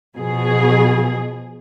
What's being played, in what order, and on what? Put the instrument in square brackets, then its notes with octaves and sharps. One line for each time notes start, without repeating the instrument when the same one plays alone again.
[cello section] B2 F3 G#4